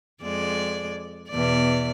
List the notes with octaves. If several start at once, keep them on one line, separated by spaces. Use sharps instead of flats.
F2 G#3 D5
E2 B2 D5